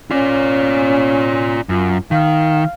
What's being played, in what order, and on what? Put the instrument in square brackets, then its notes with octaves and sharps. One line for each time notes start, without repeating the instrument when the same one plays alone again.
[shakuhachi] C#4 [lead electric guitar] F4 D5
[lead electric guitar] F#2 [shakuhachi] F4
[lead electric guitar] D#3 [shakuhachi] F5